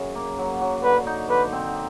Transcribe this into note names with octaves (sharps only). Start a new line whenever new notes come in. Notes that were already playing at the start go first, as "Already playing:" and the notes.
Already playing: F#2 C#3
A#3
F#3
F#3
D3 B4
D#4
D3 B4
C4